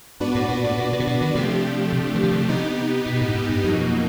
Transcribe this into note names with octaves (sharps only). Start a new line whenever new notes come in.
G#2 B3 D4 F#4 B4 D5
A2
A#2
A2
A#2
B2
C3
B2
D#3
C3 F3 A3 D4 G4
C3
E3
D#3
D3
C#3
C3 B3 D#4 G4
B2
A2
G#2
G2
F2 B2 F#3 A#3 D#4